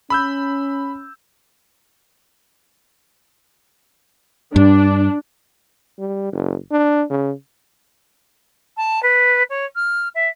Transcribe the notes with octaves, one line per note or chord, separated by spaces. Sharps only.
C#4 B5 E6 G6
G2 D4
G3
F#1
D4
C#3
A5
B4
C#5
F6
E5